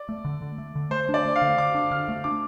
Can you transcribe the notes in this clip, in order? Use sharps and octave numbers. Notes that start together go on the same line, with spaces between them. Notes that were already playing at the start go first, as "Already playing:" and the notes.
Already playing: D5
A3
D3
D3
A3
D3
A3 C5
D4
D5
A3
F5
D3
D3 D6
D4
D3 F6
A3
D4 D6